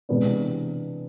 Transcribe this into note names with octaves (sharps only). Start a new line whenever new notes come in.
C3 E3 G#3 B3 D4